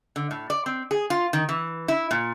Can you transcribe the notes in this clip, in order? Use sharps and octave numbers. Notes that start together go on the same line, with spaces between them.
D3
A2
D5
C4
G#4
F4
D#3
E3
E4
A#2